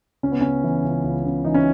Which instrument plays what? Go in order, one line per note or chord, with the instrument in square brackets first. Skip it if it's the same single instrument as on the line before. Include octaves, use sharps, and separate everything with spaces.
[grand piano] C#2 C#4
B3
C#3 C#4
E3
C#2
C#2
C#3
E3 D#4
C#4